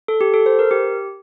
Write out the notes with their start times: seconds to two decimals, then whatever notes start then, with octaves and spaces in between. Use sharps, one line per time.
0.08 A4
0.21 G4
0.34 A4
0.46 C5
0.59 A#4
0.71 G4